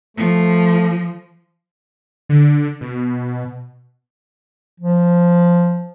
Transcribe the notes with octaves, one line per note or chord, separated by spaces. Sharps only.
F3 A3
D3
B2
F3